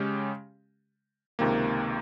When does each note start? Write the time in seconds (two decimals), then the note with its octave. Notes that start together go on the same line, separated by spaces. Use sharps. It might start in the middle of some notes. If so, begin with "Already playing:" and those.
Already playing: C#3 G#3 C#4 G4
1.39 C#2 C3 D#3 A#3